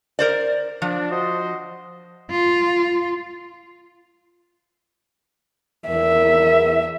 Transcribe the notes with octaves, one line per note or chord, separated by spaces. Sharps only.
A#4 C5 D5
F3 D4
F#4 C5 D#5
F4
E2 A#4 E5